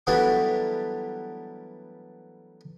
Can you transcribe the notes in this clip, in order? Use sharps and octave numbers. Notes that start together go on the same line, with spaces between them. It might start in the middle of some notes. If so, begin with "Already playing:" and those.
E3 F#3 G3 A3 B3 D4